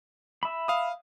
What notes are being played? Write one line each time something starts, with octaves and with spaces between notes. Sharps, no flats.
E5 B5
F5 D#6